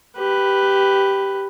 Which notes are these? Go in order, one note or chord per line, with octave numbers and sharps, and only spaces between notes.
G4 B4